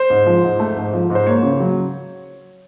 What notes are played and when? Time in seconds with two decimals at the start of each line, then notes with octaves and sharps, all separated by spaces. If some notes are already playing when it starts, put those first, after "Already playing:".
Already playing: C5
0.10 G#2
0.26 F3
0.43 G#2
0.60 A3
0.76 G#2
0.94 F3
1.10 G#2
1.15 C5
1.27 A#3 C#5
1.43 C#3
1.60 F#3